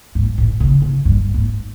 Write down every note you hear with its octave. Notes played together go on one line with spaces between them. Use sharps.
G#2
A2
C#3
C#3
G2
G#2